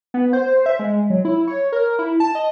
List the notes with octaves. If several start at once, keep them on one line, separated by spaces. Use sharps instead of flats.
B3
C5
E5
G#3
F#3
E4
C#5
A#4
E4
A5
D#5